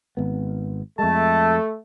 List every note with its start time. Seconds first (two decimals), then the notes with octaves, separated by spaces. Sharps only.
0.17 G#1 B3
0.99 F2 G#3 A3 A5